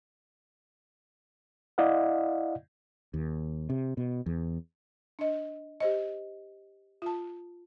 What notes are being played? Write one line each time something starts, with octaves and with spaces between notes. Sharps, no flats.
E4 D5 D#5 F5 F#5
D#2
C3
B2
E2
D4 D#5
G4 C5 D#5
F4 A5